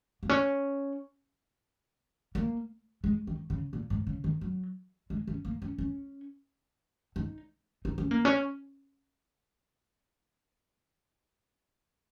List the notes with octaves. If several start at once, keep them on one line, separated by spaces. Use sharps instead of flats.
A#3
C#4
A#3
G#3
D#3
C#3
A#2
G#2
C#3
D#3
F#3
G#3
C#4
A#3
C#4
C#4
D#4
D#4
C#4
A#3
C#4